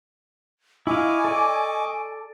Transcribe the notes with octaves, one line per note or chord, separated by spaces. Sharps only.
E4 D#5 F5 G#5 C#6 D6
A4 D5